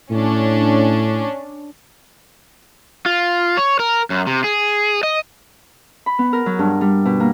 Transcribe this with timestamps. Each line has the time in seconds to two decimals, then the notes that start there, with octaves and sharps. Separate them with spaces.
0.11 A2 C#4 D4
3.06 F4
3.57 C#5
3.79 A#4
4.10 F#2
4.27 C3
4.44 G#4
5.03 D#5
6.06 B5
6.19 B3
6.33 A#4
6.46 F#3
6.59 G2
6.81 G3
7.05 B2
7.20 A#3